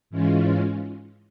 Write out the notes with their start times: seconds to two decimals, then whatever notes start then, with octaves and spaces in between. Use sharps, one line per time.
0.10 G#2 E3 G#3 C#4 F4